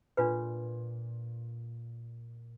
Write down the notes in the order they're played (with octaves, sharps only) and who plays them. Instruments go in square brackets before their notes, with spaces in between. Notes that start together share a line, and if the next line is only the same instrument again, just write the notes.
[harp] A#2 [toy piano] D4 F4 B4